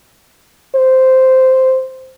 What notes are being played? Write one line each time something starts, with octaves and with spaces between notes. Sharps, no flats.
C5